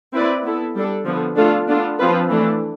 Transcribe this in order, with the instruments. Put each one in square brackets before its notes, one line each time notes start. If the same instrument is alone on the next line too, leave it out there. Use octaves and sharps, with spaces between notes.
[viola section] C4 E4 B4 D5
B3 E4 A4
G3 D4 A4
D3 F3 B3
A3 D4 F4 A4
B3 D4 F4 A4
F3 C4 F4 B4
E3 A3 D4 A4